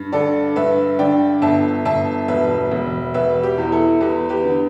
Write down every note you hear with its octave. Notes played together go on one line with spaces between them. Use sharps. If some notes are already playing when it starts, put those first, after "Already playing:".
Already playing: G2
D3 A4 D5
G2 B4 E5
D3 D5 G5
G1 E5 A5
G1 E5 A5
E1 B4 E5
E1
E1 B4 E5
G4
E2
E4 A4
E2 G4 B4
G4 B4
D3